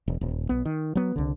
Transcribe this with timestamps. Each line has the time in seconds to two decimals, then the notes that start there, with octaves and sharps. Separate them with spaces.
0.08 E1
0.21 D#1
0.49 B1 B3
0.65 D#3
0.95 F#3 B3
1.16 C2 D3